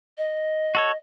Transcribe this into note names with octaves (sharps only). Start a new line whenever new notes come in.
D#5
F#4 A4 C#5